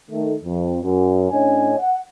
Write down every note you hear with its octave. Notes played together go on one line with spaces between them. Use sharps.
D#3 A3
F2
F#2
A2 C#4 D4 C#5 D#5 G#5
F#5